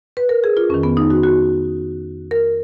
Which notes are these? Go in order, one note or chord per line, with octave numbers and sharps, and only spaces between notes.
B4
A#4
G#4
F4
F2 D#3 C#4
B3
D#4
F#4
F#4
A#4